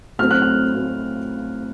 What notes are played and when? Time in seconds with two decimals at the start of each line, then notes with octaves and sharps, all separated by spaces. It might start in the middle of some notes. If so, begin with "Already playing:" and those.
0.19 A2 F#3 A3 C4 F6
0.31 F#6
0.42 F6
0.74 A2 F#3 A3 C4